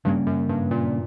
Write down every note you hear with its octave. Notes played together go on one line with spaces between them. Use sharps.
G2 C#3 G3 A#3 C#4
F#2
G2
A#2